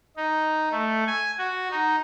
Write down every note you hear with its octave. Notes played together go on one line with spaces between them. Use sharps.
D#4
A3
G#5
F#4
D#4